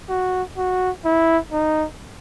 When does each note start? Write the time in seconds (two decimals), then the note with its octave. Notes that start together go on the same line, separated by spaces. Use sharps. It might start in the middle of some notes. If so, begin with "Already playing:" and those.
0.09 F#4
0.57 F#4
1.05 E4
1.52 D#4